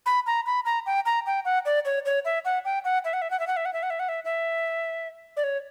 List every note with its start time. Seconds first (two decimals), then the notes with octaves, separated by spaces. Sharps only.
0.06 B5
0.27 A#5
0.46 B5
0.65 A#5
0.86 G5
1.06 A#5
1.26 G5
1.45 F#5
1.66 D5
1.85 C#5
2.06 C#5
2.25 E5
2.45 F#5
2.65 G5
2.85 F#5
3.05 E5
3.13 F#5
3.22 E5
3.31 F#5
3.40 E5
3.47 F#5
3.57 E5
3.65 F#5
3.73 E5
3.83 F#5
3.90 E5
3.99 F#5
4.09 E5
4.25 E5
5.37 D5
5.44 C#5